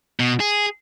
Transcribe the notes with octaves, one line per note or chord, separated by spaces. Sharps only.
B2
G#4